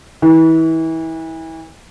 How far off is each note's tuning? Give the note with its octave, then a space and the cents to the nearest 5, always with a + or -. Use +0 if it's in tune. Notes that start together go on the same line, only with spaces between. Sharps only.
E3 -30